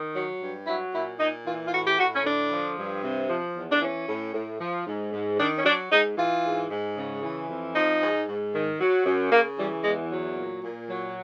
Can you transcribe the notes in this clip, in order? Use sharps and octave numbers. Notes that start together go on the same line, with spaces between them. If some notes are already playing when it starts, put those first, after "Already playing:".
Already playing: D#3
F#3
G2
F#3 E4
A#2 E4
A#2 D#4
E3 F4
F4
A2 F#4
G4
A2 F#4
C#4
D3 D4
F3
G2
C3
F3
E2
D4
E3 C#4
A2
A2
F3
G#2
G#2
D#3 D4
C#4
F#3 D4
G#2 D#4
E3 F4
G#2
G#2
C#3
E3
F2
F3 D#4
G#2
G#2
D#3
F#3
F#2
C#3 A#3
E3 G3
E2 G#3
F#3
A#2
A#2
F#3